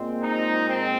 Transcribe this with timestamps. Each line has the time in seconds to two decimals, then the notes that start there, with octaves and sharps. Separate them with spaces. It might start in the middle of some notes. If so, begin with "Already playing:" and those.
Already playing: A#2 G#3 C4
0.22 D#4
0.69 C4